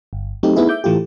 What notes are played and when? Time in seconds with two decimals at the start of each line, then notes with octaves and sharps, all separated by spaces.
0.13 G1
0.43 F#3 A3 C4 D#4 G4
0.56 A3 B3 D#4 E4 G#4
0.69 E5 D6 G6
0.84 A2 E3 A3 F4 G4